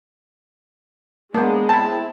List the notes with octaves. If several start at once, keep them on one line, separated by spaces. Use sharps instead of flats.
G#3 A#3 B3 D4
C4 E4 A5